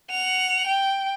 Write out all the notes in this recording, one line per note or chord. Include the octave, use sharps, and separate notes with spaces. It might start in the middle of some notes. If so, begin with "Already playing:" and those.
F#5 F7
G5